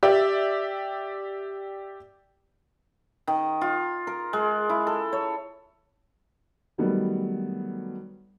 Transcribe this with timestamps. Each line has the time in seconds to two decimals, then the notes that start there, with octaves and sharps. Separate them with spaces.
0.03 G4 D5 E5
3.27 D#3
3.61 F4
4.07 A#4
4.33 G#3
4.69 E4
4.87 A4
5.13 C#5
6.78 D#3 F#3 G3 A3 B3 D#4